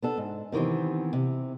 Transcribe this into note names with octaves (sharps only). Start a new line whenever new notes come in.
B3 D4 A4
G#2
C3 D#3 E3 B3 C4
C3